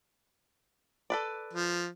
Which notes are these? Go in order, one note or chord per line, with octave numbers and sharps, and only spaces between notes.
A4 B4 D5
F3